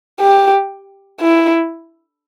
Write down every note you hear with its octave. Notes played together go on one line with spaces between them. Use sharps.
G4
E4